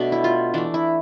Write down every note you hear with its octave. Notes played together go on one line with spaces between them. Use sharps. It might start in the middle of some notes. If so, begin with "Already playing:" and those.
Already playing: B2 A3 D4
E4
F4
E3 A3 D4
E4